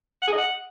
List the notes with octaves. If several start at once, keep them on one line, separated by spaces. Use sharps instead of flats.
F#5
G#4
D#5
F#5